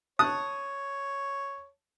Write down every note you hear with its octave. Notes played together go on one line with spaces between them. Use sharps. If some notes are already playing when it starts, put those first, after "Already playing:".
C#5 A5 D#6 F#6